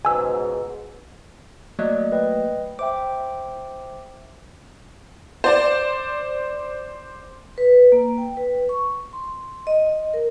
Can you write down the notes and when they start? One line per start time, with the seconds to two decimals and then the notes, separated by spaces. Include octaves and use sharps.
0.05 C#2 G#2 B2 G#5 E6
1.79 F#3 A3 A#3 D5 D#5
2.12 B4 D#5 G5
2.79 C5 E5 G5 D6
5.44 C5 D5
7.58 B4
7.92 A#3
8.18 G5
8.37 B4
8.69 C#6
9.13 C6
9.67 D#5
9.89 D#5
10.14 A#4